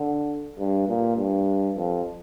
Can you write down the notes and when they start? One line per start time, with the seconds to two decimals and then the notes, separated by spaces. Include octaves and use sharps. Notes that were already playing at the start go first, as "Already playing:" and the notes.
Already playing: D3
0.59 G2
0.89 A#2
1.17 G2
1.76 F2